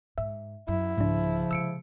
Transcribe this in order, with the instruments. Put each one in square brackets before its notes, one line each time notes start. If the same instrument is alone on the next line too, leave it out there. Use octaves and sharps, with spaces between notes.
[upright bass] G#2 [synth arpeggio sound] E5
[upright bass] F#2 [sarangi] E4
[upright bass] C2 A#3 [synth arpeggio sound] G#2 D4 [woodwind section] C#3 F3
[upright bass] C3 G#3 [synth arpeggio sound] E6 C#7 D7